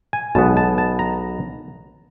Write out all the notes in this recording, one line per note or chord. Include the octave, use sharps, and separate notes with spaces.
G#5
B1 B2 G#3 B3 A5
A5
A5
A#5